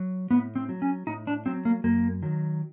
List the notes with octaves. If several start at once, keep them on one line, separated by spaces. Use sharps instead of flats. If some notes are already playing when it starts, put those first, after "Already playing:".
Already playing: F#3
A2 B3
C4
F#3
C#4
A2 D#4
D4
F#3 C4
A#3
F#2 A#3
D#3 F#3